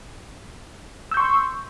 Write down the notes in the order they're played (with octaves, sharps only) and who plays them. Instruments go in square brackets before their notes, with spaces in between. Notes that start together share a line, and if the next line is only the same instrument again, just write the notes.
[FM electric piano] E6
G6
C#6
C6